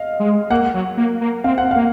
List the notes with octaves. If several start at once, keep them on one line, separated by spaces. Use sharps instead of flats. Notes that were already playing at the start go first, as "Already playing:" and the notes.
Already playing: D#5 F5
G#3
A#3 F#5
F#3
A#3
A#3
C4 F5
F#5
A#3 F5